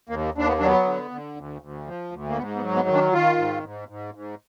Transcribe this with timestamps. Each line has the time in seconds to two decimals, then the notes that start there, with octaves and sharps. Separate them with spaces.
0.09 D#2 A#3
0.34 D#2 D4
0.47 B3
0.59 F#3 D4
0.66 B3
0.85 D3
1.11 D3
1.36 D2
1.61 D2
1.87 F3
2.12 D2
2.29 A#3
2.37 G#2 B3
2.56 B3
2.62 F#3
2.75 B3
2.88 D#3
2.94 D4
3.12 D#3 F4
3.38 G#2
3.64 G#2
3.88 G#2
4.14 G#2